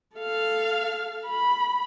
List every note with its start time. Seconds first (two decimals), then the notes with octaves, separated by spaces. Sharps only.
0.17 A4 F5
1.25 B5